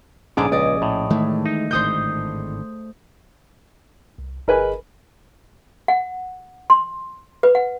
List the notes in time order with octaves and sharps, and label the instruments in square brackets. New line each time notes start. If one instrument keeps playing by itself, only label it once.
[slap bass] A#1 C#4 [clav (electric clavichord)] G#2 D3 [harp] G#4 D5
[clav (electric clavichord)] C#2 [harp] D5 D#5
[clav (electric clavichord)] A2
[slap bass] D#3 E3 G#3 [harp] A3
[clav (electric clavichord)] D#4
[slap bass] G#1 A2 D3 [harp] C5 D#6 G6
[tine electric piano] C2
[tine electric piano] G1 G#4 D#5 [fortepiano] A#4 B4 G#5
[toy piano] F#5
C6
B4
F#5